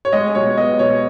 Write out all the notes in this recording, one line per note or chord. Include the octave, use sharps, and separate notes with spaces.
C#5
G#3 D#5
B2 C#5
B3 D#5
B2 C#5